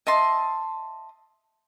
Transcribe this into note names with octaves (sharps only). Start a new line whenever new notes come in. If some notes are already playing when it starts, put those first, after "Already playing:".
D#5 E5 A5 C6